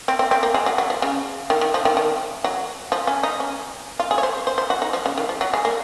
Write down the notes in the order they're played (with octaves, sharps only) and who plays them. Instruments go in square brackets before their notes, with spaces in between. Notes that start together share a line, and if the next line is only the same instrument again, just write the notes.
[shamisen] C4
C4
C4
A#3
G#3
F#3
F#3
F3
C#3
D#3
D#3
F3
D#3
D#3
F#3
F3
C#4
D#4
C#4
F4
G#4
C#5
C5
C5
C5
F#4
D#4
F3
C#3
D#3
F3
F#3
G#3
A#3